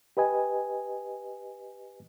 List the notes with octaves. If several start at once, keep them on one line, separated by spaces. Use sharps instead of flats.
G4 B4 D#5 G#5